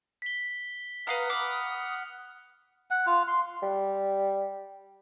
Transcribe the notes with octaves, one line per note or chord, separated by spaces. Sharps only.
B6 G7
B4 F5 F#5 A#5 D#6 F6
B5 D6
F#5
F4
C6
G3